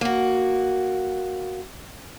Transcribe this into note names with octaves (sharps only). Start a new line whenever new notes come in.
A#3 F#4